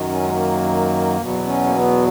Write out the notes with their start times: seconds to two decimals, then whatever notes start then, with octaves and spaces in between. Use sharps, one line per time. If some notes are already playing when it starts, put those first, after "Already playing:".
Already playing: F#2 D#3 F#3
0.09 C#4
0.22 G#3
0.31 A#3
1.17 E2 B2 F#3
1.46 C#4
1.67 A#3
1.74 B3